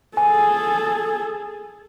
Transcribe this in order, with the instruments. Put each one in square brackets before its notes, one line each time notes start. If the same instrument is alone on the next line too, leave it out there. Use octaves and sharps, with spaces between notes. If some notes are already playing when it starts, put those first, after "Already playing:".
[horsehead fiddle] G#4 A4 [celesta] G#5